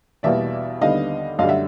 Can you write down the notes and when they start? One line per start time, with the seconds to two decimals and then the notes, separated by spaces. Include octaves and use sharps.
0.23 E2 B2 G3 A#3 D5 E5
0.81 D#2 D3 G3 B3 D#5 F5
1.39 F#2 D3 G3 D#5 F5
1.49 E5 F#5